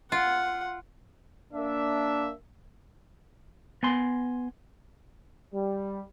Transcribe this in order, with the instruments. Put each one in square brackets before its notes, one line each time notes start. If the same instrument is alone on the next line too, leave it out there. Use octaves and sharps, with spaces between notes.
[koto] F4 [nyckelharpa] F#5
[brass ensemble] A#3 D4 E5
[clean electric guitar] B3 G#5 C6
[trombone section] G3